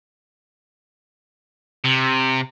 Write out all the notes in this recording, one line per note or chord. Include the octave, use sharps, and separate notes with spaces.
C3